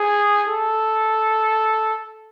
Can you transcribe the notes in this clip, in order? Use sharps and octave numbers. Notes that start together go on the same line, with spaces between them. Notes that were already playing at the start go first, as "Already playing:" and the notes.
Already playing: G#4
A4